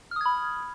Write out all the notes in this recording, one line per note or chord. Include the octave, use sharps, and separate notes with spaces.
B5 D#6 F6 G#6